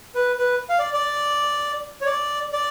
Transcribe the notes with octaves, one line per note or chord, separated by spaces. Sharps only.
B4
B4
F5
D5
D5
C#5
D5
D5